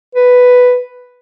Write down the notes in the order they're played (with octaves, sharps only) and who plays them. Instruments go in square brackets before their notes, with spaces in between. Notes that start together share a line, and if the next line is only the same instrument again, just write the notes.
[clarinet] B4